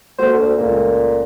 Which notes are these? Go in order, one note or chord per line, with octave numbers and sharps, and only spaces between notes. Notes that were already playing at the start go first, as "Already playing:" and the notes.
A#3 F#4 A4 C5
D2
C#2 A#2 A3